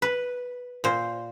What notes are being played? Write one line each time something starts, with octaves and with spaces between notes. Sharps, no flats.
B4
A#2 C5